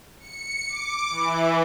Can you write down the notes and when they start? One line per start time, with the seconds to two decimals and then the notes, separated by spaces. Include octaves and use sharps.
0.19 C#7
0.68 D6
1.10 E3